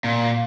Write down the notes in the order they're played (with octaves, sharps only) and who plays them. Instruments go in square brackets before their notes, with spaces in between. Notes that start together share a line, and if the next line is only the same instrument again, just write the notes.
[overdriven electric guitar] A#2